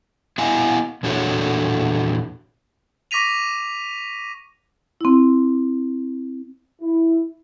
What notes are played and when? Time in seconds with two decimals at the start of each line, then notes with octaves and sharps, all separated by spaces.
0.38 B3 E4 D#5 F5 G#5
1.03 E2 A#2 D4 F#4 A4 C#5
3.11 C#6 D6 A#6 B6 D#7 F7
5.01 C4 E4
6.81 E4